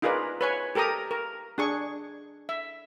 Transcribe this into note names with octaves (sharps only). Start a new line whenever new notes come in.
D#4 F4 G#4 A#4 B4 D5
B4 C#5 G#5
G4 A4 A#4 A#5 D#6
A#4
D4 G#4 C#6
E5